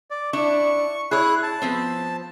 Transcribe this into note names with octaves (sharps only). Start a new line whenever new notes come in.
D5
D4 E4 C#6
E4 G#4 C#5 F#6
A5
F3 B3 C4